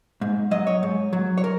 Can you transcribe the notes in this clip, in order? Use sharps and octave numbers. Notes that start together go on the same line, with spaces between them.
G#2
F#3 D#5
C#5
G#2
F#3
C#5
A#4